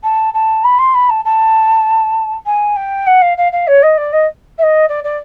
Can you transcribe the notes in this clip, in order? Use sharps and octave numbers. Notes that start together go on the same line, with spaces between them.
A5
A5
B5
C6
B5
A5
A5
G#5
G5
F#5
F5
F5
F5
C#5
D#5
D5
D#5
E5
D#5
D5
D5